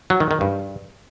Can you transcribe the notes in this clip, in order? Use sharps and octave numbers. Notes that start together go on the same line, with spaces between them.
F#3
D#3
D#3
G2